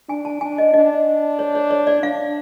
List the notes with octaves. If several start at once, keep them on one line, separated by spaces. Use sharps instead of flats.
D4 G#5
A5
D4 G#5
D#5
D4 D#5
C#5
C#5
C#5
D5
D4 F5